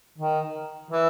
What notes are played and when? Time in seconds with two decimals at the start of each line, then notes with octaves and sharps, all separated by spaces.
0.18 D#3
0.90 E3